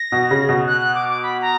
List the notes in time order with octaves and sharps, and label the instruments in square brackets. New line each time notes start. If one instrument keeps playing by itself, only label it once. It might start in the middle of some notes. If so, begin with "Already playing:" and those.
Already playing: [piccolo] A#6
[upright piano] B2
C#3
B2
[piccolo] F#6
F#6
D6
D6
B5
A#5